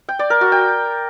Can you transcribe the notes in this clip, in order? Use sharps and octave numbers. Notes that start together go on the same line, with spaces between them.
G5
D5
A#4
F#4
G5